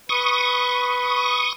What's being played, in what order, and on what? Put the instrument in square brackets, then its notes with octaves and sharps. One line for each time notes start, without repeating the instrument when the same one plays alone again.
[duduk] B4 [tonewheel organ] C#6 D#6